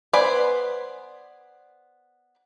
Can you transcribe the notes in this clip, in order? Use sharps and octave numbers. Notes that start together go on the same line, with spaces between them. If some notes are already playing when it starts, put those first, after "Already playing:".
B3 B4 C5 D5 G#5